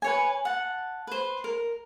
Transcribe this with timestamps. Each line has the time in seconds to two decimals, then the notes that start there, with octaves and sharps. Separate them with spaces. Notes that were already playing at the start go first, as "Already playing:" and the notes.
0.02 B4 C#5 G#5
0.45 F#5 A5
1.07 B4 C5
1.44 A#4